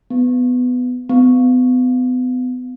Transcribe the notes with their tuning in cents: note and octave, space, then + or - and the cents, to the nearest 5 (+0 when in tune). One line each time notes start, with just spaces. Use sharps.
B3 +15
B3 +35